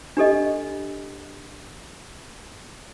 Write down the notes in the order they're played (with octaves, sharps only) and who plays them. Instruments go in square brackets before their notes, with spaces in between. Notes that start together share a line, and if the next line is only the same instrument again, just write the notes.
[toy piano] D4 G4 A4 D#5